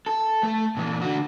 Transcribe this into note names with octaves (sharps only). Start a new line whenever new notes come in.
A4
A3
A#2 E3
D3 F#4